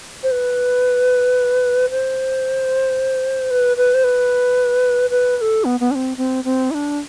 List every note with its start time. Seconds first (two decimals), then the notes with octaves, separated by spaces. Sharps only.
0.23 C5
0.31 B4
1.90 C5
3.51 B4
3.77 B4
3.94 C5
4.04 B4
5.10 B4
5.38 B4
5.41 A4
5.65 B3
5.80 B3
5.91 D4
5.95 C4
6.17 C4
6.44 C4
6.71 E4
6.74 D4